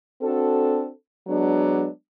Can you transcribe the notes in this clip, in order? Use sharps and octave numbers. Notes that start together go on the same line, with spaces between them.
C4 D4 F#4 A4
F#3 G#3 B3 D4